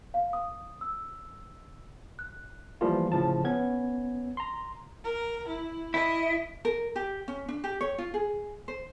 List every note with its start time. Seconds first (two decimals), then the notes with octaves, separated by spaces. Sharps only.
0.14 F5
0.33 D#6
0.81 E6
2.19 F#6
2.81 E3 F3 G3 A3 A#3 F4
3.12 A2 C#3 F3 A5
3.44 B3 C#4 G#6
4.37 A#5 C6
5.04 A#4
5.47 E4
5.94 E4 D#5
6.65 A#4
6.96 G4
7.28 C#4
7.48 D4
7.64 G4
7.81 C#5
7.98 F4
8.14 G#4
8.68 C5